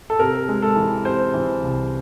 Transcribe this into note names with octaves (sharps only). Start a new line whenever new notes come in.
A4
C3 A#4
G#3
A4
E3
C3 C5
E3
C2